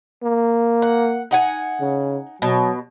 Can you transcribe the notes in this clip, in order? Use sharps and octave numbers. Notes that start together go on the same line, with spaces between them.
A#3
F#5
D#4 F#5 G#5
C#3
B2 F#3